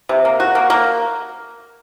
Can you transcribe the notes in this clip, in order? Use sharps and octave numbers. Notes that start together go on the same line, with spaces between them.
C3
A#3
F#4
A#3
A#3